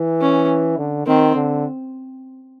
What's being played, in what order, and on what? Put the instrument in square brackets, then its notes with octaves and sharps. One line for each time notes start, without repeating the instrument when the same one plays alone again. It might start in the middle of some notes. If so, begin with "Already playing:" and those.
Already playing: [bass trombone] E3
[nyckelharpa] C#4
[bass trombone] D3
[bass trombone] D#3 [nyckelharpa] C4
[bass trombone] D3